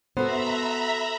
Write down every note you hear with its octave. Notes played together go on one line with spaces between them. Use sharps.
B3 F#4 A4 C5 E5 A#5 B5